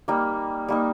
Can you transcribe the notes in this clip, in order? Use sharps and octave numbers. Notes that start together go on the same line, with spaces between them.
G3 A#3 D#4
G3 A#3 D#4